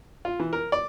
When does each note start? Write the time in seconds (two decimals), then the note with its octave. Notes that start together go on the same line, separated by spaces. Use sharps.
0.25 F4
0.40 E3
0.53 A#4
0.72 D5